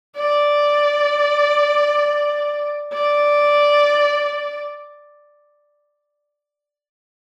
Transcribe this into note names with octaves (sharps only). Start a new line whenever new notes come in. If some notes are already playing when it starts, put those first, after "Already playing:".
D5
D5